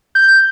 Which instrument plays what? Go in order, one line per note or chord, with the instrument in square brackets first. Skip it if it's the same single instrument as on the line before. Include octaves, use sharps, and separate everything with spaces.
[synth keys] G6